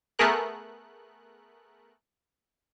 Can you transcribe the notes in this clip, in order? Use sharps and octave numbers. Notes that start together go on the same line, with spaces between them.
A3 B3 G#4 A#4 F#6